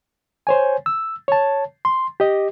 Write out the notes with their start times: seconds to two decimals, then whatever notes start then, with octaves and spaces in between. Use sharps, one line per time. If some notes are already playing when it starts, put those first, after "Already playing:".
0.47 C5 C#5 G#5
0.86 E6
1.28 C#5 A5
1.85 C6
2.20 G4 D#5